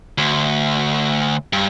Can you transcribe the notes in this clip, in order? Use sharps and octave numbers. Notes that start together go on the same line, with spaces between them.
D2
G2